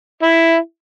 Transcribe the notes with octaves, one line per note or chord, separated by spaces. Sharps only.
E4